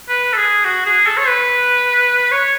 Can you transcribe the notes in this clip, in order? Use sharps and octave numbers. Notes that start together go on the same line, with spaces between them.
B4
A4
G#4
F#4
G#4
A4
C#5
B4
C#5